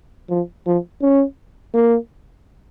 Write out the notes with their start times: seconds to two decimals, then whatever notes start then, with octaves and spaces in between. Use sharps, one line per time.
0.30 F3
0.66 F3
1.02 C#4
1.74 A#3